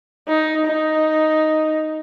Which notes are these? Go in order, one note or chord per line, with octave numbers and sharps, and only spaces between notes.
D#4
D#4